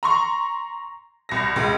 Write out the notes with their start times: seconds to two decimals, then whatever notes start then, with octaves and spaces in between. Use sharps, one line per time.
0.03 A#5 C6 C#6
1.29 C2 A#6
1.56 C#2